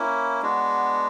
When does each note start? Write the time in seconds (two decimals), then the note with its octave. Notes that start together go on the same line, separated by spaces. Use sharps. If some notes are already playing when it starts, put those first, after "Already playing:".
Already playing: A#3 C#4 E4
0.42 G#3 B3 D4 F#4